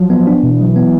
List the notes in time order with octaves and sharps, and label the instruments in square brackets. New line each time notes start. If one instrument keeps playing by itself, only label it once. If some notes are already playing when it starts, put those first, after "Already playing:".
Already playing: [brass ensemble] F3 [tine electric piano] F#3
[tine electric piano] B3
D4
[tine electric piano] B2 [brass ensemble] E3
[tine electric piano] F#3
B3